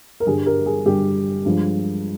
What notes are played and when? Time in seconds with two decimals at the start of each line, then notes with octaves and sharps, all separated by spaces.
0.20 A#4
0.26 G2 D3 G3 G#4
0.46 G4 A#4
0.66 G#4
0.85 G2 D3 G3 G4
1.45 G2 F3 G#3